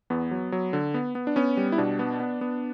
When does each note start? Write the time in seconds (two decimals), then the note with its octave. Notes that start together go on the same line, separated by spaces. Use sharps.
0.10 E2 B3
0.31 F#3
0.52 F#3
0.73 D3
0.94 B3
1.15 B3
1.27 D4
1.36 B3 C#4
1.57 G3
1.72 E4
1.78 B2 D4
1.99 B3
2.20 B3
2.41 B3